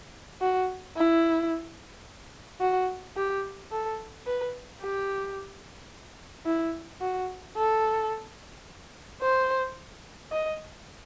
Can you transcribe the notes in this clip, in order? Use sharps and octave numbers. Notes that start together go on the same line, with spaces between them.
F#4
E4
F#4
G4
A4
B4
G4
E4
F#4
A4
C5
D#5